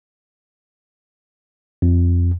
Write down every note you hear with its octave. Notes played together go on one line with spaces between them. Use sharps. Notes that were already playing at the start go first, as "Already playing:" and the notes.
F2